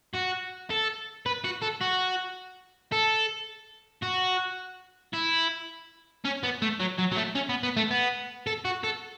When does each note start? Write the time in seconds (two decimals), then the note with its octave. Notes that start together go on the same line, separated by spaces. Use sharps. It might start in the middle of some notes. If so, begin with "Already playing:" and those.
0.15 F#4
0.71 A4
1.26 B4
1.44 F#4
1.62 A4
1.81 F#4
2.92 A4
4.03 F#4
5.14 E4
6.25 C#4
6.43 B3
6.62 A3
6.80 F#3
6.99 F#3
7.12 F#3
7.17 A3
7.35 C#4
7.49 B3
7.63 B3
7.77 A3
7.91 B3
8.47 A4
8.65 F#4
8.83 A4